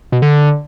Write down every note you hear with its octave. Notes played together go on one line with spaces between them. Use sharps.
B2
D3